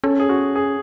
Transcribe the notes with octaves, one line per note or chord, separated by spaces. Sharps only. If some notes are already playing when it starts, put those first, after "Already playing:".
C#4 A4
G#4
F#4
G#4